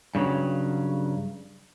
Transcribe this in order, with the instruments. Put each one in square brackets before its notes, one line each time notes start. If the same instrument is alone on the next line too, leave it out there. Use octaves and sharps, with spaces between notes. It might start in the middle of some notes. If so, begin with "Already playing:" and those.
[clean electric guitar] G2 C#3 F3 F#3